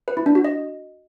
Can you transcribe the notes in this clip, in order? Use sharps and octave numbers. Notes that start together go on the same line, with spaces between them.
B4
E4
D4
F#4
D#5